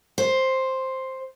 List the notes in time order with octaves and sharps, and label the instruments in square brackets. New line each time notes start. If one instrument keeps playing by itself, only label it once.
[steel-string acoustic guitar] C5